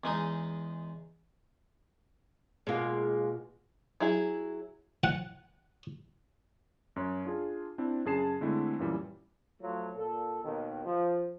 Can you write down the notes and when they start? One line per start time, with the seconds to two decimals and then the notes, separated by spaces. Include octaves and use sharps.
0.04 E2 G#3 D#4
2.67 B2 G#3 A#3 B3 F4
4.00 F#3 E4 G#4
5.04 F#5
6.96 F#2 C#5
7.25 D4 F4 G#4
7.78 C4 D4 E4
8.05 F#2 C#3 G#4 A5 C7 E7
8.41 D3 G#3 A3 C4 E4
8.79 F#2 A#2 E3 G3
9.61 F3 F#3 A3 F4
9.96 A#2 A4
10.44 D#2 B2 D#3
10.85 F3